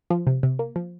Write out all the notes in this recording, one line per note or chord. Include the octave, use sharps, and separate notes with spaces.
F3
C3
C3
A#3
F3